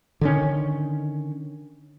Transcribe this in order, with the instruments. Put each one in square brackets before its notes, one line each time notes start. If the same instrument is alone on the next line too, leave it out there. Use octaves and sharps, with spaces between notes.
[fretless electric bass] D3 D#3 C#4